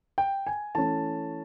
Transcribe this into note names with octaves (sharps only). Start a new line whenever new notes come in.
G5
G#5
E3 A3 C#4 A5